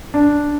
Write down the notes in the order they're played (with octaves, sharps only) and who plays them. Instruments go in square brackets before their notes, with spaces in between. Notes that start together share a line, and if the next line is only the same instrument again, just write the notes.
[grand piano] D4